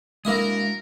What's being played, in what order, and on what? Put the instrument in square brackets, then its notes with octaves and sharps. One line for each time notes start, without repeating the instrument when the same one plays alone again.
[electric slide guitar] G#3 D4 F#4 [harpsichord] A#3 E4 D#6 [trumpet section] A#4